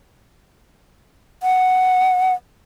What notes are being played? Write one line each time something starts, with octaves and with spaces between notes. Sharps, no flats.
F#5